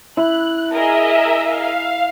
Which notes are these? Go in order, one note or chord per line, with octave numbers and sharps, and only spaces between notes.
E4 F#6
G#4 A#4 D#5 E5
F5